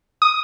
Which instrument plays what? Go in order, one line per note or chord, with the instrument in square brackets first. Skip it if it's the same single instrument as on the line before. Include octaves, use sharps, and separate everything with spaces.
[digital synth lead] D#6